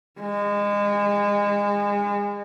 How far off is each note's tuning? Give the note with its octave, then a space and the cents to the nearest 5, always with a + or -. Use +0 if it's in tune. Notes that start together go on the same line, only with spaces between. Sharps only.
G#3 -30